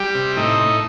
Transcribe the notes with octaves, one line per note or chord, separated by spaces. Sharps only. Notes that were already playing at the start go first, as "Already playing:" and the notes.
Already playing: G3 G4
C3
A2 D#4
A2